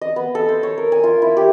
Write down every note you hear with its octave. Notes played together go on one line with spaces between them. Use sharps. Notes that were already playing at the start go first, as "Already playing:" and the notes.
D#5
B3
A4
C5
C#5
A#4
G#5
F4
E4
G4